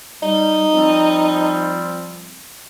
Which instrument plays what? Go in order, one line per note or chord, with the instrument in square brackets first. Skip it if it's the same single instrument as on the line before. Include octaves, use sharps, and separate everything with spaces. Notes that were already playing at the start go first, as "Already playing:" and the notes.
[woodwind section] G3 [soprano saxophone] D#4
[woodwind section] F3 G3 C4